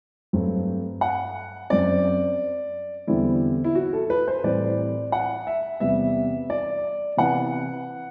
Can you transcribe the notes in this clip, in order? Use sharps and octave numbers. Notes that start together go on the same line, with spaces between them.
G2 F#3 A3 C4
F#5
F#2 F#3 C4 D5
E2 D3 G3 C4 E4
E4
F#4
A4
B4
C5
A2 E3 G3 C4 D5
F#5
E5
E2 C3 G3 B3 E5
D5
C3 E3 B3 F#5